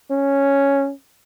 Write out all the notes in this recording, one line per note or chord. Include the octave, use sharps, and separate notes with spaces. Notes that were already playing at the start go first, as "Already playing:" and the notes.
C#4